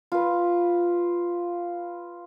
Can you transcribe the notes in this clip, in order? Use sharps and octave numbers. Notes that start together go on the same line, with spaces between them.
F4 B4